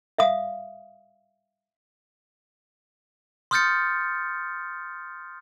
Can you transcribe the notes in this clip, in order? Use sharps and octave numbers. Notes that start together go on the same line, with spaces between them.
E5 F5 D#6
C6 D#6 F6 G6 A6 C#7